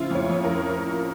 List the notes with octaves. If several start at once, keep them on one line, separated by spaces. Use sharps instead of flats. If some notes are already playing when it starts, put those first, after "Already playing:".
Already playing: C#3 F3 E4 F4
F2 C#5
F2
A#4